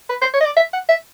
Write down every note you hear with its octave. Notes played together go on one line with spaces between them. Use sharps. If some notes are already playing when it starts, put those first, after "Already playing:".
B4
C5
C#5
D#5
D5
E5
F#5
E5